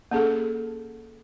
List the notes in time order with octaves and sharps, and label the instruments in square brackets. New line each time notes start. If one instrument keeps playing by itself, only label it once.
[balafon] A#3 C#4 G#4 A4